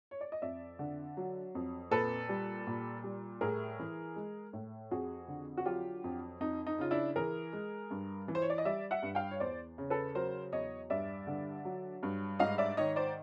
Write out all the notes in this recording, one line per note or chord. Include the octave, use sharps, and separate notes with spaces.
C#5
D5
D#5
F2 D5 E5
D3
F#3
F2
A#2 A4 B4
G3
A#2
G3
A2 G#4 A#4
E3
G#3
A2
F2 F#4 G#4
D3
F#4
F#3 F4 G4
F2
F2 D#4
D#4
C#3 F4
D4 E4
E3 G#4 A#4
G#3
G2
E3
C5
C#5
D5
D#5
G3 D5 E5
E5 F#5
G2
F5 G5
C#5
E2 C5 D5
C#3
A4 B4
F#3 A#4 C5
E2 C#5 D#5
G2 D5 E5
D3
F#3
G2
G#2 D#5 F5
D5 E5
D#3 C#5 D#5
C5 D5